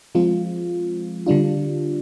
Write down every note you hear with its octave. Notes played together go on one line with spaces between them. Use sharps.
F3 G#3 C4 F4
D3 G3 D4 F4